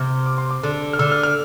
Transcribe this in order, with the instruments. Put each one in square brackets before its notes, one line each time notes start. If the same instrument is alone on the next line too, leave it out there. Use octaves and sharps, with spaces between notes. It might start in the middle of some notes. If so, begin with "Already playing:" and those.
Already playing: [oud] C3 [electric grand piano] F6
[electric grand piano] D6
C6
D6
[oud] D3
[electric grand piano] F6
[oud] D3 [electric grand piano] E6
[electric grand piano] F6
F6